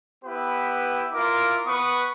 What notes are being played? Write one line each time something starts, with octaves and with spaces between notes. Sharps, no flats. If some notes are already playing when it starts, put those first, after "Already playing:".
B3 E4 G4 B4
E4 F4 A#4 D6
B3 B4 C#6 D#6